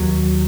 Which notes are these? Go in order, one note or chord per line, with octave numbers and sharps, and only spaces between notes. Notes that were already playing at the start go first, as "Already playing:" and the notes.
Already playing: D#2 F#3